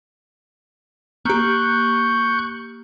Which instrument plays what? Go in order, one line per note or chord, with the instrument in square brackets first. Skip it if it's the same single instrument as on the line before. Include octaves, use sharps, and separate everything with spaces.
[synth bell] A#3 G4 [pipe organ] C#6 F#6 G6